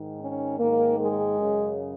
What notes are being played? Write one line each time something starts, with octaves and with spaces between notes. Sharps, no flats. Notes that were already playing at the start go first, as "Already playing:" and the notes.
Already playing: G#2 D#3
C#4
G#2 D#3 A#3
G#3
F#2 C#3